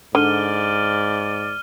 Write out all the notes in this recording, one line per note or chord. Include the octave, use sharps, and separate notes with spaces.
G#2 D3 D5 F6 D#7 G7